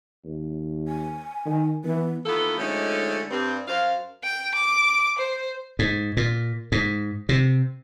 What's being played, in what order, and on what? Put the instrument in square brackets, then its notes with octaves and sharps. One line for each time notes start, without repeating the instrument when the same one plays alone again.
[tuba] D#2
[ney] G#5
[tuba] D#3
[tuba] E3 [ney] B3
[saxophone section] D#3 E3 A#3 B3 F4 A4
D3 F3 G#3 A3 C#4 D#4
G2 C4
F#2 C5 F5
[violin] G5
D6
C5
[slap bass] G#2
A#2
G#2
C3